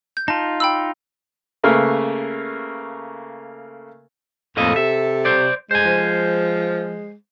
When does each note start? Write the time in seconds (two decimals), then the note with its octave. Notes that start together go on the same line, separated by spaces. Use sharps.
0.17 G6
0.28 D#4 F4 A5
0.60 G5 B5 E6
1.63 C#3 A3 A#3 A#4 B4
4.57 F2 A2 A#3 A4 D#5
4.76 C3 E5
5.25 C5 D5
5.71 G#3 C5 G#5
5.85 F3